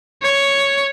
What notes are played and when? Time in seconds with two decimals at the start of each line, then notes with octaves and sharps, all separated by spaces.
0.23 C#5